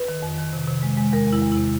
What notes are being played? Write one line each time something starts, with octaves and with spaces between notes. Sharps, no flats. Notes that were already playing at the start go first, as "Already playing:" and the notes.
Already playing: B4
D#3
F2
D#3
C3
C3
G#3
G#3
E2 A#4
E2
E4
E2
C3 E4